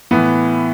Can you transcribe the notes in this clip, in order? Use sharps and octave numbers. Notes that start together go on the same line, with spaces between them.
A2 E3 B3